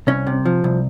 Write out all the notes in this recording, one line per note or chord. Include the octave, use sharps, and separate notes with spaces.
C2 C#4
C3
F3
C2